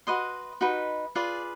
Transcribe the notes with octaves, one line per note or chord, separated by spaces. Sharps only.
F#4 B4 D#5 C6
D#4 F#4 B4 D#5
F4 G#4 B4 D5